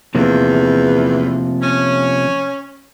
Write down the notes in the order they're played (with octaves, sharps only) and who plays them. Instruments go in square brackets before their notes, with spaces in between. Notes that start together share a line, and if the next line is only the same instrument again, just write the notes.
[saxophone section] E2 [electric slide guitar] C3 F3 A#3
[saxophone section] C#4